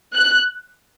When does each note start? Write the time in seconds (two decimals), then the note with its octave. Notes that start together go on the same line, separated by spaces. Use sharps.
0.15 F#6